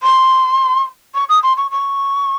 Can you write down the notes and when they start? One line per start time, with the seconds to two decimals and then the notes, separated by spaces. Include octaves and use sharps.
0.02 C6
1.14 C#6
1.28 D#6
1.42 C6
1.57 C#6
1.70 C#6